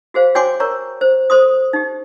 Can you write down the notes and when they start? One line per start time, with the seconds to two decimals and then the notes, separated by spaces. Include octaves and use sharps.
0.14 F#4 G#4 C5 F5
0.35 F#4 C#5 G5 G#5 C6 D6
0.60 A#4 C#5 A#5 C#6
1.01 C5
1.30 A4 C5 C6 D#6
1.73 D#4 G4